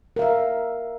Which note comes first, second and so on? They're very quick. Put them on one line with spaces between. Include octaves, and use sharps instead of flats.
A#4 F5 E5